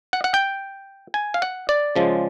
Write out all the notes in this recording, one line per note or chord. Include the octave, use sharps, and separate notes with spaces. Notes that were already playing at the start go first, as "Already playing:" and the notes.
F#5
F#5
G5
G#5
F5
F#5
D5
C#3 F3 G#3